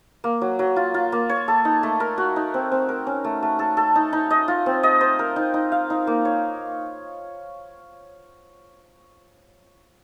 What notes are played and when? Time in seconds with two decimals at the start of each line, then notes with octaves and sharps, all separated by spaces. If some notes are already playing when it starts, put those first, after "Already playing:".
0.24 A#3
0.41 F#3
0.59 F#3
0.76 F4
0.94 F4
1.12 A#3
1.29 C#5
1.48 A4
1.65 D#4
1.83 A3
2.00 A#4
2.18 F#4
2.36 D#4
2.54 C4
2.72 C4
2.89 A#4
3.07 C#4
3.24 A3
3.42 A3
3.59 A4
3.77 A4
3.96 D#4
4.13 D#4
4.31 D#5
4.48 F4
4.66 C4
4.83 D#5
5.01 C5
5.19 A#4
5.36 D#4
5.54 D#4
5.72 F5
5.90 D#4
6.07 A#3
6.25 C#5